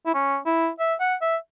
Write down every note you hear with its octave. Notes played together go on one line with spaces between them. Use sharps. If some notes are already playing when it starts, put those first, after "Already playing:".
E4
C#4
E4
E5
F#5
E5